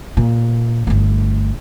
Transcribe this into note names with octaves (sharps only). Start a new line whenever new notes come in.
A#2
G1 A3